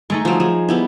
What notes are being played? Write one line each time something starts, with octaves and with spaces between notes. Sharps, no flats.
G#3 A3 D#4 C#6
F3 F#3
F3 G#4
G3 B3 E4